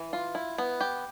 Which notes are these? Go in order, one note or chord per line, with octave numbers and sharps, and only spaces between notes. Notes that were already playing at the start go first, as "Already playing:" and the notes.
Already playing: E3
F4
E4
B3
G4